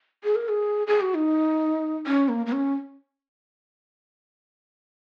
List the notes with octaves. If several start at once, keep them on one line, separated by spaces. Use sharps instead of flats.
G#4
A#4
G#4
G#4
F#4
D#4
C#4
A#3
A#3
C#4